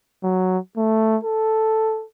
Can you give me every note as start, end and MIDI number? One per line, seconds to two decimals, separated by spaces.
0.23 0.58 54
0.77 1.17 57
1.23 2.05 69